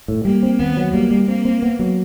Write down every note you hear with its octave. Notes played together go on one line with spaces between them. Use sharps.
A2
G3 A#3
C4
D#2 B3
F#3
G3 A#3
G3
A#3 C4
C4
B3
F#3